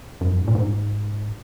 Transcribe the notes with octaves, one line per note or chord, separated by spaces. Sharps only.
F#2
G#2
A#2
G#2